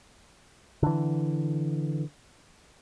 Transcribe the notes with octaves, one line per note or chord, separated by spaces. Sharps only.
D3 E3